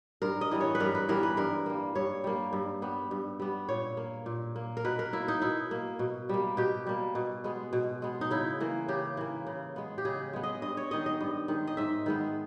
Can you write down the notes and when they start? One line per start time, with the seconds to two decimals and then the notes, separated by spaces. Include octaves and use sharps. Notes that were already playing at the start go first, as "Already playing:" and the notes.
0.22 G2 A#4
0.41 D#5
0.51 E3 G3 B3
0.61 C#5
0.75 B4
0.80 G2 A#4
0.95 B4
1.09 E3 G3 B3 A#4
1.23 B4
1.37 G2 A#4
1.66 G3 A#3
1.95 G2 C#5
2.24 G3 A#3
2.53 G2
2.82 G3 B3
3.11 G2
3.40 G3 B3
3.69 A#2 C#5
3.97 A#3
4.26 A#2
4.56 A#3
4.77 A#4
4.85 B2 B4
4.99 A#4
5.13 A#3 E4
5.28 D#4
5.42 B2 E4
5.71 A#3
5.99 B2
6.29 G3 A#3
6.57 B2 G4
6.86 G3 A#3
7.15 B2
7.44 G#3 B3
7.73 B2
8.02 G#3 B3
8.21 D#4
8.30 C#3 E4
8.60 E3 A#3
8.88 C#3 G4
9.17 E3 A#3
9.47 C#3
9.76 G#3 B3
9.98 G4
10.05 C#3 G#4
10.33 G#3 B3
10.43 D#5
10.62 G2 D#5
10.77 C#5
10.91 D#3 G#3 D#5
11.06 D#5
11.20 G2
11.48 D#3 G#3
11.67 D#5
11.77 G#2 E5
12.06 D#3 G#3 B3